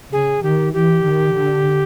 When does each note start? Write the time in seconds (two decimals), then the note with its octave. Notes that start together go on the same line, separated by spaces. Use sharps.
0.12 C#3 G#4
0.43 D#3 G4
0.73 E3 G4
1.04 D#3
1.35 D3